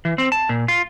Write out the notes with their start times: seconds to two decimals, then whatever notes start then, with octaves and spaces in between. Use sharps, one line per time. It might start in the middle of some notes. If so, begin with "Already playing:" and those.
0.05 E3
0.18 C4
0.32 A5
0.49 A#2
0.68 F4